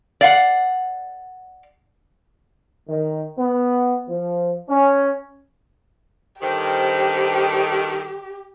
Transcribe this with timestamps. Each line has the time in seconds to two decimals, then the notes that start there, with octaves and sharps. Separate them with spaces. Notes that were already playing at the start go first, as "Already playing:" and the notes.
0.21 D5 F5 F#5
2.87 D#3
3.38 B3
4.08 F3
4.69 C#4
6.42 G2 D3 D#3 G4 C5 G5